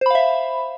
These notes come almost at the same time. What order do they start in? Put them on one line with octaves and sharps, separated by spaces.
C5 B5 F5 E5